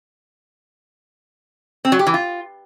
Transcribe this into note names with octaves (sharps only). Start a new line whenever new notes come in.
C4
F#3
G4
E3
F4